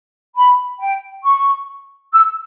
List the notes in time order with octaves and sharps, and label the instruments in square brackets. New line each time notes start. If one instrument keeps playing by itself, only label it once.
[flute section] B5
G5
C#6
E6